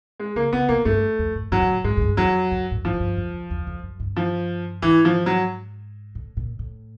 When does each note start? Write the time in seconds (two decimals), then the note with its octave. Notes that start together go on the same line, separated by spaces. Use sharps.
0.19 G#3
0.36 C#3 A#3
0.53 C#3 B3
0.69 C3 A#3
0.85 G2 A3
1.19 F2
1.35 G#2
1.52 G#2 F#3
1.62 G#2
1.69 A2
1.84 G#2 G#3
1.97 G#2
2.02 G2
2.17 F2 F#3
2.52 F#2
2.72 A2
2.84 G#2 F3
2.93 F#2
3.00 G2
3.17 F#2
3.33 F2
3.51 E2
3.67 F2
3.83 F#2
4.00 G2
4.16 F3
4.82 G#2 E3
5.05 F3
5.26 F#3
6.15 A2
6.37 A#2
6.59 A2